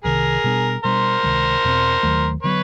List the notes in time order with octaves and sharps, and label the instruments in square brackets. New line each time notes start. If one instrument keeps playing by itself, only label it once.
[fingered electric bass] C2 C3 D#3 [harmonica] G#4 A#4
[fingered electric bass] B2 G3 B3 D4
[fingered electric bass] B2 G3 B3 D4 [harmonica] A#4 C5
[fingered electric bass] C#2 C3 D#3 G#3
E2 B2 G3 C4
D#2 D#3 F#3 A3
[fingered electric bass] D3 F#3 B3 [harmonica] B4 C#5